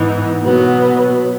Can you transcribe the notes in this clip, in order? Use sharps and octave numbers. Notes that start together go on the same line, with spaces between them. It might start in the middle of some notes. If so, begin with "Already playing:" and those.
Already playing: G#2 E3 B3 D#4
B2 F#3 B3